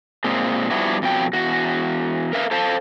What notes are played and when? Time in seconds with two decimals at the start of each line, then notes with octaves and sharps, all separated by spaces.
0.24 A#2 G#3 C4
0.70 F3 G3 B3 D4 E4 F#4
1.02 F2 B2 F#3 G5
1.33 E2 F#4
2.33 A#4 B4 E5 F5
2.51 A4 C5 F5 A5